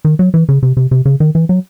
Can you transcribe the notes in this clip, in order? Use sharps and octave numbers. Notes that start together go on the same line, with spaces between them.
D#3
F#3
E3
C#3
C3
C3
C3
C#3
D#3
E3
F#3